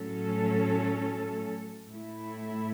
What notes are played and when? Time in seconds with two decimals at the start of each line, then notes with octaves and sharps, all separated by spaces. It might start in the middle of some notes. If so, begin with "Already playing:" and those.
Already playing: A2 F#3 C#4 A4
1.89 A2 A3 E4